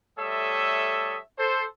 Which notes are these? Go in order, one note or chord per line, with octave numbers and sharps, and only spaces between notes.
G3 A3 A4 C#5 E5 D#6
A4 C5